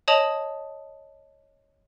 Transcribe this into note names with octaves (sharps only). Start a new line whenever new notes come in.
C#5 D#5 A5 D#6 F7 F#7